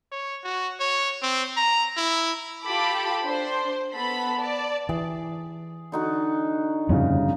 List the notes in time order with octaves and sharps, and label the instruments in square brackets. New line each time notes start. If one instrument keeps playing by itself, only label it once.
[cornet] C#5
F#4
C#5
C4
A#5
E4
[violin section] F4 G4 A4 G5 B5 D6
D4 C5 C6
B3 A4 B5
D5 A5
[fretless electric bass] E3 [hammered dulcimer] G#4
[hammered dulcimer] D3 D#4 F#4
[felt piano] G1 C#3 [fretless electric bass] F2 A2 C#4